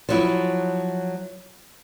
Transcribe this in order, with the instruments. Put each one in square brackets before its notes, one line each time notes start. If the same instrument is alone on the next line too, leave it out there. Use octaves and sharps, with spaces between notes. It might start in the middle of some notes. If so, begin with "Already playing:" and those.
[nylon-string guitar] F3 F#3 E4